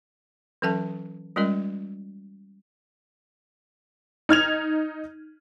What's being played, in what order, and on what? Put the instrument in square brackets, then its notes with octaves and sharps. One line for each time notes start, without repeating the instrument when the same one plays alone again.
[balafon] E3 F#3 C#4 A4 E5 A5
G3 G#3 C#4 F4 A#4 D#5
[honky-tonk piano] D#4 F6 G#6 F7